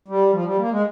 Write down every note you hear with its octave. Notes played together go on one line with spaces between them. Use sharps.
G3
F3
G3
A#3
G#3